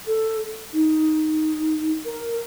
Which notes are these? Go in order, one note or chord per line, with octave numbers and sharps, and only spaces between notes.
A4
D#4
A#4